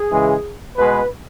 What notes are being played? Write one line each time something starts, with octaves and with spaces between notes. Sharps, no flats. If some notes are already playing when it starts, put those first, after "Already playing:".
Already playing: G#4
C#3 E3 G#3
B2 G#3 B4